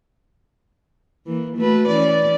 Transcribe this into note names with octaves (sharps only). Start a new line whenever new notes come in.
E3 A#3
A3 F#4 B4
E3 C#4 D5